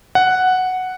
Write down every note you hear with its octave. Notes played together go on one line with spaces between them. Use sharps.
F#5